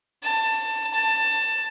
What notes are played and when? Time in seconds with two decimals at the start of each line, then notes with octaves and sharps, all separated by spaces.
0.23 A5
0.94 A5